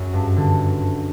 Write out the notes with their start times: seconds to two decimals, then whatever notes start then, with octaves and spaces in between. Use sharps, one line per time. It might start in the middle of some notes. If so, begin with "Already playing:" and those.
Already playing: F#2
0.13 G2
0.36 D3